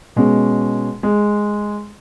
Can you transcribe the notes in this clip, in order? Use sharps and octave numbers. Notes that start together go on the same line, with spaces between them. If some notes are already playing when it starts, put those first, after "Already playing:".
B2 G#3 C#4
G#3